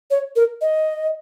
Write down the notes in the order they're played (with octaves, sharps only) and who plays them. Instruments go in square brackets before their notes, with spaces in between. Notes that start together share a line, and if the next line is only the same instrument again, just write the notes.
[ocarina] C#5
A#4
D#5